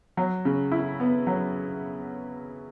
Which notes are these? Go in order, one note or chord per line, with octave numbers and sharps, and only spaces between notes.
F#3
C#3
E4
B3
F#3